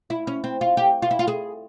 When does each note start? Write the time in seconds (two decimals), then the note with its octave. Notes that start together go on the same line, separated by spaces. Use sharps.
0.10 E4
0.27 C#4
0.44 C4
0.61 F4
0.77 G4
1.02 F4
1.11 E4
1.19 F4
1.27 G#4